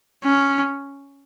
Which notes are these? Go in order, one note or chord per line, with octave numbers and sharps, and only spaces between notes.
C#4